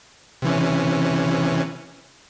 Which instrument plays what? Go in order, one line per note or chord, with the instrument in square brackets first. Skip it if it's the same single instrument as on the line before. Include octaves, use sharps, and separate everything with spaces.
[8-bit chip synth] C3 E3 C#4